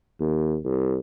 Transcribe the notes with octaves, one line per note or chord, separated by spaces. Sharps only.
D#2
C2